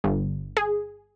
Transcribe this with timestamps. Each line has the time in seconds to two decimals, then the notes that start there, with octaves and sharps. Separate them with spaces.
0.04 G1
0.57 G#4